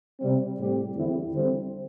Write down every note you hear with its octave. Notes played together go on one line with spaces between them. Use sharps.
C3 G3 C4
A2 G3 C4 G4
E2 D3 C4 E4
D3 G3 C4